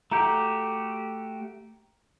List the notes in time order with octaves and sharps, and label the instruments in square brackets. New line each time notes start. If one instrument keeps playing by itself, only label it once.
[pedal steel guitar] A3 F#4 G4 [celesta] A#5 G6